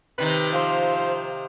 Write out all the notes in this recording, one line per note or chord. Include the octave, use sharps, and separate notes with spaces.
C3 D#3 D#4 B4
F3 C5 F5